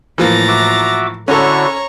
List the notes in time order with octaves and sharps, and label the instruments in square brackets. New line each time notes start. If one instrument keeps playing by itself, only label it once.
[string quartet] A2 A#5 A6 [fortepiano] E3 F3 A#3
[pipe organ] F#4 E5 D6
[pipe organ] D3 E4 F#4 [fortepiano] C#4 A4 [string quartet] C#5 A#5